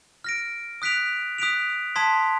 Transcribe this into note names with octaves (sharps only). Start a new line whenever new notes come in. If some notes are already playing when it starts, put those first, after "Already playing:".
F6 A#6 D7
D#6 F#6 B6 D7 F7
D#6 F#6 B6 D7 F7
A5 C6 D#6 G#6 B6